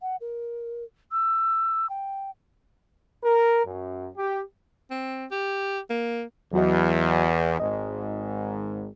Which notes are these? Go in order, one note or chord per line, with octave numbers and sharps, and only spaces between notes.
F#5
A#4
E6
G5
A#4
F#2
G4
C4
G4
A#3
E2 F#3 F#4 D#5
G#1 G#2 D#5